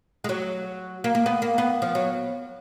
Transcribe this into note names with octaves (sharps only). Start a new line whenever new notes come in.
G#3
F#3
A#3
A#3
B3
A#3
B3
F3
F#3